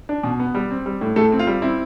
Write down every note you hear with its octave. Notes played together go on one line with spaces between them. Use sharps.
D4
B2
B3
G3
C4
G3
A2
A2 A3 A4
C4
F4
G3
C4 E4